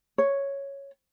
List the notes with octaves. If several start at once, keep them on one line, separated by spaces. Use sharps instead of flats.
C#5